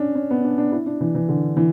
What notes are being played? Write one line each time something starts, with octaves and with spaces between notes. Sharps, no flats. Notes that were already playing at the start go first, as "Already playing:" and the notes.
Already playing: C#4 D4
C#4
B3
D4
D4
E4
D4
E3
E3
D3
E3